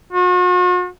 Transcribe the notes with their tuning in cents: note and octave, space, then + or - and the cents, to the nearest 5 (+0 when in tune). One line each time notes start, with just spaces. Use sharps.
F#4 -45